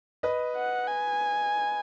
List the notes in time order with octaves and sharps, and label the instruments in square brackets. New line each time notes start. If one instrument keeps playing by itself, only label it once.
[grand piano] B4 D#5
[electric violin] F#5
G#5